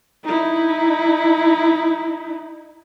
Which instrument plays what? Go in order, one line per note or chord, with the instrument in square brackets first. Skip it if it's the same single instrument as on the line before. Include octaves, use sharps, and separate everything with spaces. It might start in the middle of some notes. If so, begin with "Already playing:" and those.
[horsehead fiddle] D#4 E4